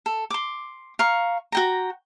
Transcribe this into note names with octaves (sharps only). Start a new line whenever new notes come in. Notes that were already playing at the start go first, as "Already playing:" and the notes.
A4
C6 D6
F5 A#5 C#6
F#4 G5 A#5